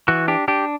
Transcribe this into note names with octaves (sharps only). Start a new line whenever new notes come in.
E3 F#4
D4 G4
D4 G4